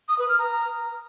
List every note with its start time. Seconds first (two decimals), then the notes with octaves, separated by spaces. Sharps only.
0.09 D#6
0.19 B4
0.29 F6
0.39 A#5